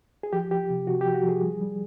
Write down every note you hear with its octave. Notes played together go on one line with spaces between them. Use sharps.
G#4
F3 G4
F3 G4
C3
C3 F#4
G4
F3
F#4
F3
G#4
G3
G3